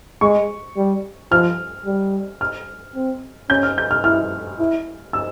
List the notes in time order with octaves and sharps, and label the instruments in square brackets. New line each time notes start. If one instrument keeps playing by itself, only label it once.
[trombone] G#3 [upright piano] C#6
[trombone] G3
[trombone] F3 [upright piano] F6
[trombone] G3
[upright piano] F6
[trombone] C4
[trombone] C#4 [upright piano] G6
[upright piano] F6
G6
F6
[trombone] E4 [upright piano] F6
[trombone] E4
[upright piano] E6